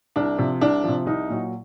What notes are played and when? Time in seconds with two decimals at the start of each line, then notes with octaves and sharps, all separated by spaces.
0.16 C2 D4
0.38 C3 F3
0.61 C2 D4
0.84 C3 F3
1.06 C2 D#4
1.29 A#2 F#3